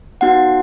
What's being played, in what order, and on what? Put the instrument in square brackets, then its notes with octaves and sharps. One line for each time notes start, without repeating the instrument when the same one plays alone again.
[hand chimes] B3 D#4 F#4 F#5